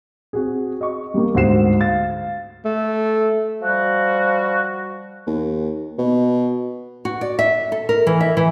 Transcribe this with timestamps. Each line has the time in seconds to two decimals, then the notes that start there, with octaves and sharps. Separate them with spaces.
0.33 C4 F#4 G#4
0.81 D#5 C#6
1.14 G3 A#3
1.34 D2 G#2 C5 F#5 C7 E7
1.81 F5 A6
2.65 A3
3.61 F3 G3 F#4
5.27 D#2
5.98 B2
7.05 F#4
7.21 D5
7.39 E5
7.72 A4
7.89 A#4
8.07 E3
8.21 E5
8.37 E3